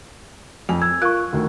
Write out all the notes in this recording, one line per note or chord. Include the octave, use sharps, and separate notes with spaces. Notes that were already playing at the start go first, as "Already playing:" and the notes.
F2 G#5
E6 G#6
F4 A#4 F5 C#6 F#6
D2 D#3